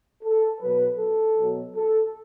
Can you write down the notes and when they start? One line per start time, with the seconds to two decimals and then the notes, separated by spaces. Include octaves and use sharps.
0.23 A4
0.60 B2 F#3 B4
0.99 A4
1.36 B2 F#3
1.75 A4